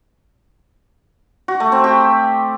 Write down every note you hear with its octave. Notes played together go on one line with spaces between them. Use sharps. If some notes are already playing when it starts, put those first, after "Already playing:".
F#4
A3
C4
G4